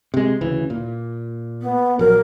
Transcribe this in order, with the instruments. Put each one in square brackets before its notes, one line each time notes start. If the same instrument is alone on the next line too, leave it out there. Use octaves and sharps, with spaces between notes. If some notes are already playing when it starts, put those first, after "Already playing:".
[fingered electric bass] C3 G#3
D2 C#3 E3
A#2
[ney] B3
[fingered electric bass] A#1 F#3 [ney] A#4